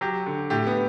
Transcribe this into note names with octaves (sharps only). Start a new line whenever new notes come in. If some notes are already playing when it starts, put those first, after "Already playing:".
F#3 G4
D3
A2 G4
B3